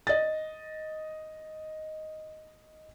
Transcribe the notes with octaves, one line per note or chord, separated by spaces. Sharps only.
D#5 A6